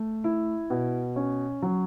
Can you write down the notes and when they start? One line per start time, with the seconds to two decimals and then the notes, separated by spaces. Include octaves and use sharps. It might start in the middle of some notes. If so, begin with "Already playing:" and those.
Already playing: A3
0.24 E4
0.70 B2
1.16 C#4
1.62 F#3